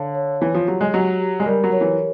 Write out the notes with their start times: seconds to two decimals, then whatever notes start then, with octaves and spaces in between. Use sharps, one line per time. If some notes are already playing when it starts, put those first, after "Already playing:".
Already playing: D3 C#5 F5 A5
0.15 C#5
0.41 E3 C#5
0.54 F3
0.68 F#3 G4
0.81 G#3
0.94 F#3 G4
1.20 G4
1.40 G#3
1.46 G3 A#4
1.64 F#3
1.72 C#5
1.81 E3